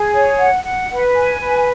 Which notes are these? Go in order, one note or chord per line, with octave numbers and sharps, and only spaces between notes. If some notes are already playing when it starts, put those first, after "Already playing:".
Already playing: G#4
C#5
F#5
F#5
B4
G#5
B4